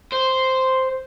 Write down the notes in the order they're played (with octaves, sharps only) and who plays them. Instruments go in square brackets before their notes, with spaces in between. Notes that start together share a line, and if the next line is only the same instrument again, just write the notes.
[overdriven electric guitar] C5